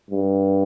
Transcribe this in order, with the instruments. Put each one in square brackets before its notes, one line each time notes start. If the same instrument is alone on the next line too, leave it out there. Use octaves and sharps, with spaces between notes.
[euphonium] G2